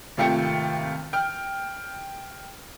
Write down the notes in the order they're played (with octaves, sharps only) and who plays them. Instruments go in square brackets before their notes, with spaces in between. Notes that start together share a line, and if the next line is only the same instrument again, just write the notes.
[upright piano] G#1 C3 A3 F4 G5 C#7
G5 F6